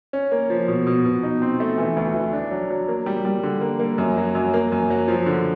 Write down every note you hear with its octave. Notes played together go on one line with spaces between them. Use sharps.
C#4
A#3
F3
B2
B2
B2
D#4
C4
A3
E3
D2
E3
D4
F#3
F#3
A#3
G3
G3
D3
A#3
A#3
F#2
F#3
F#2
A#3
F#2
F#3
F3
D3